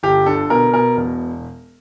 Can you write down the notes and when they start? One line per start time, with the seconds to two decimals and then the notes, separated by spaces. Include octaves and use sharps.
0.03 G1 G4
0.26 D3 A4
0.50 B2 A#4
0.74 B2 A#4
0.97 E1